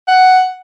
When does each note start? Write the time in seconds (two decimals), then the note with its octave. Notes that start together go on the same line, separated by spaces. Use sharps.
0.08 F#5